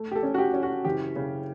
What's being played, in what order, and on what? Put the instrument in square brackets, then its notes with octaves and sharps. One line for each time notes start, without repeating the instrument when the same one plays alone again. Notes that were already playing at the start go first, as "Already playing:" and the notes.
Already playing: [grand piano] A3
G4
A4
C#4
F#4
G4
C#4
F#4
F#1 G4
C#3